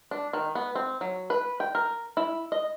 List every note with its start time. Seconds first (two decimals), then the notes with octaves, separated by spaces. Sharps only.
0.11 D4
0.33 D#3
0.55 B3
0.75 C4
1.01 F#3
1.30 B4
1.60 G5
1.75 A#4
2.17 E4
2.52 D#5